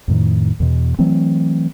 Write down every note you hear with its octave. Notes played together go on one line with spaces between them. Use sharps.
F2 A2 D#3
E2 B2
E3 F#3 A3 C4